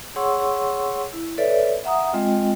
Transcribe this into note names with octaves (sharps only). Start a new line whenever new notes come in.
G#4 C#5 F#5 C6 C#6 E6
E4
A4 B4 C#5 D5 E5
E5 F#5 A#5 D#6
G#3 C4 F4 D#5 G5